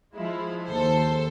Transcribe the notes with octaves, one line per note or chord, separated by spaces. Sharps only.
F3 G#3 E4
D#2 A4 C5